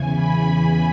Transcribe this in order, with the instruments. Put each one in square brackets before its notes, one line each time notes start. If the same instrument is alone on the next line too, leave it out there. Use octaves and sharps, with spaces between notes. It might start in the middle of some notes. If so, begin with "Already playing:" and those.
Already playing: [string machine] E2 C#3 E3 G#5
B5